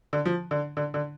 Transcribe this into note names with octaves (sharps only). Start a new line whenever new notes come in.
D3
F3
D3
D3
D3